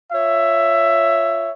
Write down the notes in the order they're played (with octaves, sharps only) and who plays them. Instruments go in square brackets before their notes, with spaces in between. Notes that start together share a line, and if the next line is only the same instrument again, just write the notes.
[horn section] F4 C#5 E5